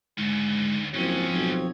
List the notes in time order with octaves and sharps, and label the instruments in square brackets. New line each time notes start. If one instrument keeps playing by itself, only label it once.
[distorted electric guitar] D2 C#3 [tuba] G#2
[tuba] F#1 [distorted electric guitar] G#2 C#4 [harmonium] F3 C4 C#5
[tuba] B1